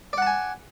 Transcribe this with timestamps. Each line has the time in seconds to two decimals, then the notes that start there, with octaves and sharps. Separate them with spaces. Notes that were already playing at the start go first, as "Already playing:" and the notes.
0.13 D5
0.18 F#5
0.22 A5
0.27 G#5